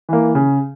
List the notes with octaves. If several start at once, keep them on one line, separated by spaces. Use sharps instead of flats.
E3 A#3
C#3